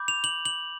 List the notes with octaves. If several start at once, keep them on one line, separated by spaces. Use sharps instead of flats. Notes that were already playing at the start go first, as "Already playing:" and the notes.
Already playing: B5 D6 G6
F7
F#7
F#7